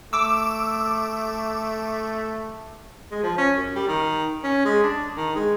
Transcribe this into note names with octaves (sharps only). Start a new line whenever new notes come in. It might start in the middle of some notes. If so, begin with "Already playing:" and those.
A3 D6 E6
G#3
F3
C#4
F#2
G3
D#3
C#4
G#3
D4
D#3
G#3